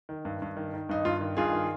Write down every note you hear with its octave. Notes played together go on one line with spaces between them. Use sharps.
D#3
G2
G2
D#3
D#3
G2 D#4
G2 F4
D#3
G2 F4 G#4
D#3